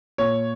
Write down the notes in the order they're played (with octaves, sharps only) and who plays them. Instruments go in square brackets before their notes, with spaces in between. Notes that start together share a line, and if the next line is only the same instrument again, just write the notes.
[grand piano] A#2 C#5